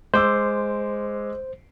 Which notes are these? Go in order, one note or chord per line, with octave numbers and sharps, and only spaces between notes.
G#3 C5 D6 E6